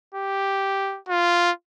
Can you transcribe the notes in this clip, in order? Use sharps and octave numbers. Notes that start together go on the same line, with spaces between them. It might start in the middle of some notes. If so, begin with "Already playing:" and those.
G4
F4